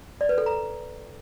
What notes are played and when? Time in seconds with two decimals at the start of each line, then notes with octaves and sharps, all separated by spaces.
0.21 D5
0.29 B4
0.38 A4
0.46 A#5